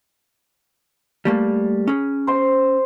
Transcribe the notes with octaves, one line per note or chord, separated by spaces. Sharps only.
G3 A3 A#3
C#4 G#4
C5 C6